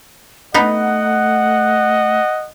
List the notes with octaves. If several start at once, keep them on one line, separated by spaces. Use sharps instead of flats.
A3 B3 D#4 D#5 F#5